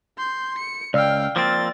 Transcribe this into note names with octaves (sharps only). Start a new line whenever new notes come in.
C6 G6
C#7
C#2 D5 F5 G5 E6 F6
F3 A#3 C4 A6